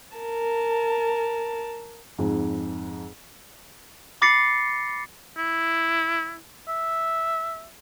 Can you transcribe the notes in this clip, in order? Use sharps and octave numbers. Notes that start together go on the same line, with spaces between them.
A#4 A5
F2 G#2 G#4
B5 D6 A6 A#6 C7 C#7
E4
E5